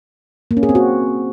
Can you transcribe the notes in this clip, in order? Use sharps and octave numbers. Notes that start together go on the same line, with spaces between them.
A#3
C#4
G#4
C4
F#4